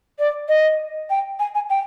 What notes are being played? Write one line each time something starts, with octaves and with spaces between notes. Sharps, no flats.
D5
D#5
G5
G#5
G#5
G5